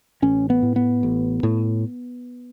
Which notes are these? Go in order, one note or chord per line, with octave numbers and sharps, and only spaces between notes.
A1 C#4
B3
A2
B3
A1
A2